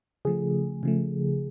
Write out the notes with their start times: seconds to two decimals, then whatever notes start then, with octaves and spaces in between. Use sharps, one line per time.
0.25 C#3 F3 A3 G#4
0.83 C#3 F3 A3